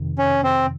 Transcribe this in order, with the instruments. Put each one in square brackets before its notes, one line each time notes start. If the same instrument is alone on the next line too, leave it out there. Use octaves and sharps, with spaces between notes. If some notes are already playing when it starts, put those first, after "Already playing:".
Already playing: [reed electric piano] F2 C3 D#3
[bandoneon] C#4
C4